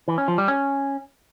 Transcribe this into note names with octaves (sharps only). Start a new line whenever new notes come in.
E3
C#4
F3
G3
C#4